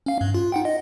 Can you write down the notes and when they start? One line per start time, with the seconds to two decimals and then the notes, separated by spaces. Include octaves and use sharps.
0.06 C#4 F5
0.21 G2
0.35 F4
0.52 D#4 F#5 G5
0.65 D#5